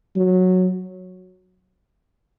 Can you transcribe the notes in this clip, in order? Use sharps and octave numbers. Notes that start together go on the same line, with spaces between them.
F#3